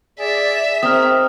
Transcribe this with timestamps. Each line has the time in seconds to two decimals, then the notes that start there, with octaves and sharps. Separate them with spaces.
0.19 G#4 D5 E5
0.83 D#3 C4 G#4 A#5 D#6 F6